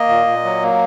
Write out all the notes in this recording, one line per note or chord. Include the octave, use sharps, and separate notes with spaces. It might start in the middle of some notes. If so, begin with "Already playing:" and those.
Already playing: A#3 D#5
A#2
A#2
F#3
A#3